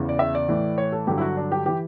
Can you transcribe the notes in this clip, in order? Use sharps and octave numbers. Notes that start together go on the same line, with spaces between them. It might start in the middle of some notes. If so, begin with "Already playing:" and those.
Already playing: E2 C#3 E3
D5
E5
D5
A2 E3
C#5
A4
G2 D3 F#3 G4
E4
F#4
D4
G4
E3 G4